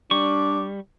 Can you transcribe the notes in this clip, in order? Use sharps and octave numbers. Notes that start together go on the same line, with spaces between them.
G3 D4 C#6 D6